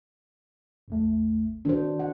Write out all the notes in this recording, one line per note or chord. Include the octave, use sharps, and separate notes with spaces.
A1 E2 A3
D#3 D4 F#4 C5
F#5